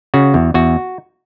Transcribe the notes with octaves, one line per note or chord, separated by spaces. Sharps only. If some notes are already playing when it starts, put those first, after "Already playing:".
C#3 F#4
E2
E2 F#4